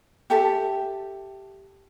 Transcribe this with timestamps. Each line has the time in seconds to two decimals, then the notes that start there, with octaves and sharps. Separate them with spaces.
0.30 G4 A4 E5 A5